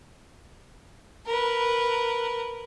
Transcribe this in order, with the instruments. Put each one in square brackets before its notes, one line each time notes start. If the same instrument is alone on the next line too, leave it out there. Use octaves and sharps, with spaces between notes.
[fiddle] A#4 B4